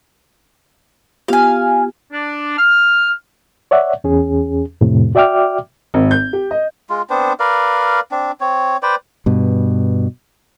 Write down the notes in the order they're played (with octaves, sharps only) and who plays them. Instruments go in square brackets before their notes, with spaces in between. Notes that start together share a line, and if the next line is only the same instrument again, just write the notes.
[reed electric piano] B3 F4 G4 [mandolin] F5 G#5
[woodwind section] D4
F6
[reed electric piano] C#5 D5 E5 F#5
E2 C#4 G#4
F2 A2 C3
F#4 D5 E5 G5 D6 F6
[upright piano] G#1
G6
G4
D#5
[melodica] G#3 F4
B3 C4 D4 C5
A#4 B4 D5 F5
C4 D4
C4 C#5
B4 C5 D5 G5
[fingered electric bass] G2 B2